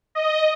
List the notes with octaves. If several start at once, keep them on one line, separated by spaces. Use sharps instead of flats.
D#5